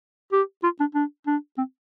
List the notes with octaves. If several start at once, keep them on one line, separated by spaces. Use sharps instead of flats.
G4
F4
D4
D4
D4
C4